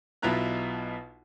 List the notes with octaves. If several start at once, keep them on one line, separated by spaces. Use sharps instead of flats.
B1 B2 E4 F4 A#5 F#6